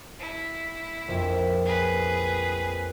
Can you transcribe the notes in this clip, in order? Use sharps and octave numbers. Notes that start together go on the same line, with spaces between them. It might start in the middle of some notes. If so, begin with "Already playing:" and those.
E4
A#1 F2 E5
G#4 B4